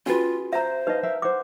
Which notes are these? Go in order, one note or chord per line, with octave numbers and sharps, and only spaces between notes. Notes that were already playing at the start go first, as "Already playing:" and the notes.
C#4 F4 F#4 G#4 B4
C5 E5 A#5
D#4 B4 D#5 F5
A#4 E5 F5
C5 F#5 D6